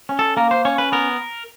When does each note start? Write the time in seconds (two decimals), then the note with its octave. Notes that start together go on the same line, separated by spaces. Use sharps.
0.09 C#4
0.19 A4
0.37 A#3 A#4
0.51 C5
0.65 C#4 C#5
0.78 B4
0.92 B3 A#4